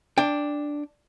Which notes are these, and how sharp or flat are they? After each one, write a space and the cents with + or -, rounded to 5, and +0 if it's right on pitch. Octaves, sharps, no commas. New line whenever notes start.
D4 +0 G5 +25